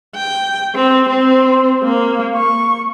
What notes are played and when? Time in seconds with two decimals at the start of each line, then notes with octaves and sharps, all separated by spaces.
0.16 G5
0.75 C4
1.09 C4
1.83 A#3
2.36 C#6